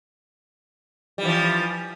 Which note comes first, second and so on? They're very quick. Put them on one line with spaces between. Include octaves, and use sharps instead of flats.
G3 E3 F3